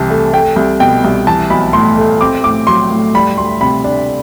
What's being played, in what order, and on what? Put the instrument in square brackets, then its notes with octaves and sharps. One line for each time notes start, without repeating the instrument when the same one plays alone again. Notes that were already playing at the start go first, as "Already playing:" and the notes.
Already playing: [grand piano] C2 C3 E3 A5
A3
A3 G5
C2
B2 G5
C2
E3 A5
B1 B5
A2 C6
A3
C4 D6
A2 D6
F#3 C6
A2
G3 B5
D2 C6
C3 B5
D4